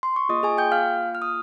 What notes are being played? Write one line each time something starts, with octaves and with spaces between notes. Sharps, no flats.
C6
C#6
A#3 F4 G#4 D#5 D#6
G#4 G#5
G5 G6
F5 F6
F6
D#6